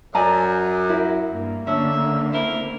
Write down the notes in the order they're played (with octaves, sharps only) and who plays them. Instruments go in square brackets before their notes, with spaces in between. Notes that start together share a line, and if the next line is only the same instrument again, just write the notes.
[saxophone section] F#2 [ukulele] D5 G#5 A#5
[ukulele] E4 A#4
[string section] G2 A#3
[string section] D3 A3 A#3 [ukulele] C#4 D4 [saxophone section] E5
[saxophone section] C4 E4 A#4